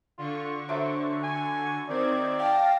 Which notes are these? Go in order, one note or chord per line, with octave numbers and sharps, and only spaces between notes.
D3 F4 C#6
F#3 A3 C5 D6
G#5
D#3 C4 D5 G#6
F5 G5 A5 A#6